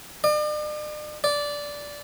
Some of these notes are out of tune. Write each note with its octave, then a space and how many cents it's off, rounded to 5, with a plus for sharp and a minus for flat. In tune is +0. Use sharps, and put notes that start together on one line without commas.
D5 +45
D5 -10